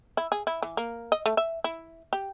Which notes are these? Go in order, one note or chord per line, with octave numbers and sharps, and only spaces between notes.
E4
G#4
E4
E3
A#3
D#5
A3
E5
E4
G4